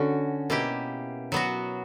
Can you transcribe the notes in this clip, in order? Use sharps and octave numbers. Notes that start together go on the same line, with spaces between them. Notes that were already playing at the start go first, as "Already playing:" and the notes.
Already playing: D3 C#4 F#4
B2 A#3 E4 G4
F#3 B3 F#4